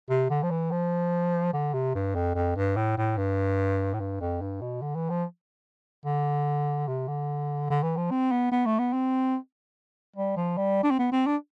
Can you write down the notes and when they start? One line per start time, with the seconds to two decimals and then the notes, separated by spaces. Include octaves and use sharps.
0.10 C3
0.30 D3
0.43 F3
0.51 E3
0.71 F3
1.53 D3
1.74 C3
1.95 G2
2.15 F2
2.35 F2
2.56 G2
2.76 A2
2.97 A2
3.18 G2
3.94 A2
4.00 G2
4.21 F2
4.41 G2
4.61 B2
4.82 D3
4.95 E3
5.10 F3
6.05 D3
6.88 C3
7.08 D3
7.70 D3
7.83 E3
7.97 F3
8.11 C4
8.32 B3
8.52 B3
8.66 A3
8.79 B3
8.93 C4
10.16 G3
10.37 F3
10.58 G3
10.84 D4
10.91 C4
10.99 B3
11.12 C4
11.27 D4